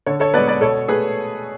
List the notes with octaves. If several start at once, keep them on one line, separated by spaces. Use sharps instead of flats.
D3 A4 C#5
A4 C#5
G#3 B3 B4 D5
B4 D5
B2 A4 C#5
A3 G#4 B4